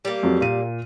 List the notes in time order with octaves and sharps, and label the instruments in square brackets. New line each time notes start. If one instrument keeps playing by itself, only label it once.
[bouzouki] G3 A#3
[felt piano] F2 F#3
A#2 D#7